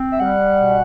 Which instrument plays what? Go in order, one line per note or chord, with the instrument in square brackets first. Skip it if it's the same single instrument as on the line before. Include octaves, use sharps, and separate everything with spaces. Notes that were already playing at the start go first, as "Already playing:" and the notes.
Already playing: [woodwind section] C4
[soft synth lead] E5
[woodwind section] G3 [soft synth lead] F#5
[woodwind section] B2